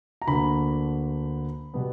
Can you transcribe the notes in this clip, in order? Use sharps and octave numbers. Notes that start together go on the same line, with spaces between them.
A#5
D2 D3 A#3 B5
B2 G3 B3